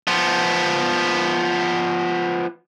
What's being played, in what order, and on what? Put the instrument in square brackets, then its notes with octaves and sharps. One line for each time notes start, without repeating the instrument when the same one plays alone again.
[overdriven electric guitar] F3 B3